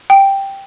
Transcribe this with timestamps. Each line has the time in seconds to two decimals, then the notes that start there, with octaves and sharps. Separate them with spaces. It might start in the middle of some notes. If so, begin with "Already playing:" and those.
0.10 G5